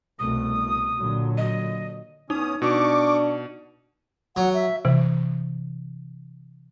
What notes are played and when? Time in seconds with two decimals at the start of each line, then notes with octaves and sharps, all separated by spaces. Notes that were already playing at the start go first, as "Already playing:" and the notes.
0.19 C2 B2 A3 D#6
0.98 A#2 D3 F#3
1.37 D#5
2.30 E2 C#4 D#4 D#6
2.62 B2 D4 C#6 D6
4.36 F#3 F#5
4.54 E5
4.85 C3 E3